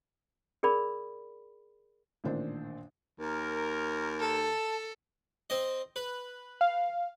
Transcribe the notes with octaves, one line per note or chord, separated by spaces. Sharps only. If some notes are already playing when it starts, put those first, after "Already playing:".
G#4 A#4 D5 B5
A1 A#2 D#3 D4 C5
D#2 A#4
A4 A5
C4 D#5
B4
F5